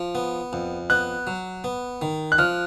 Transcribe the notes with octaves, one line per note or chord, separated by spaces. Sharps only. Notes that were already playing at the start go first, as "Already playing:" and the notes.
Already playing: F3
B3
F2
B3 F#6
F#3
B3
D#3
F#6
F3 F6